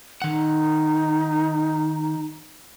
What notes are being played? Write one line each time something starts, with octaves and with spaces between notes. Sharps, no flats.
D#3 D#4 F#5